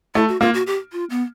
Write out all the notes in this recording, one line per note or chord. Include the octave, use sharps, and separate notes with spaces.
A3 E4
F#4
A#3 F4
F#4
G4
F4
B3